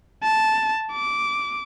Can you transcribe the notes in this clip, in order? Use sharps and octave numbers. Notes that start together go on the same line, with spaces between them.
A5
D6